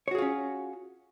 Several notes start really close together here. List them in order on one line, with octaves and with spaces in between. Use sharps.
C#5 F#4 G#4 F4 C#4